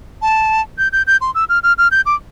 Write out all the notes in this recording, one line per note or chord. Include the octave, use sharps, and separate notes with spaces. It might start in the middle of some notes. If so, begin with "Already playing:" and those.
A5
G6
G6
G6
C6
E6
F6
F6
F6
G6
D6